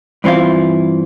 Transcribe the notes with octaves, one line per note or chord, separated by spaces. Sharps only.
G2 E3 C4 E4 F4